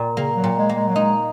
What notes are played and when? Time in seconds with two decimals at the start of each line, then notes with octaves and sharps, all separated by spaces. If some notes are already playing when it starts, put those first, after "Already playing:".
Already playing: A#2
0.16 C#3 A#3
0.36 F#3
0.44 A#2
0.57 G#3
0.69 A#3
0.76 G#3
0.88 F#3
0.95 G#3 D#4